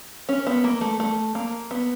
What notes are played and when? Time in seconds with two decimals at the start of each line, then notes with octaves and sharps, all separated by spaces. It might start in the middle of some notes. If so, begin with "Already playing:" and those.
0.29 C#4
0.47 B3
0.64 A#3
0.81 A3
1.00 A3
1.35 A#3
1.71 B3